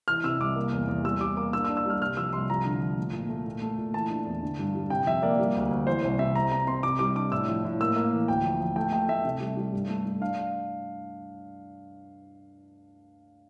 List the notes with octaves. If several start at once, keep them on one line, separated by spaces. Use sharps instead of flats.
E3 F6
C3 E6
C2 D6
A#3
E2
E2
G3 E6
G3 D6
A#3 D6
D4 E6
E6
D4
E6
G3 F6
C2 F6
F3 E6
C2 C6
F3 A#5
D3
F3
A3
A#2
A3
A#2
A3
A#2
E3 A5
D4
E2
D3
G2
G3
C3 G5
F2 E5
A#3 D5
G3
D2
D2
E3 C5
C2 C5
C3 E5
C4 A#5
C4 A#5
C4 C6
C3 D6
G3 D6
D4 D6
A2 E6
F3
A2
A#3 E6
A#3
E3
D2 G5
F3
F3
A3 G5
A3 G5
A3 E5
C3
G3
G3
G2
A3
A3
D4 F5